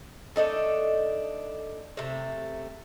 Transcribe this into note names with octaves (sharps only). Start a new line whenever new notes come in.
A3 D4 D#4 A4
C3 A3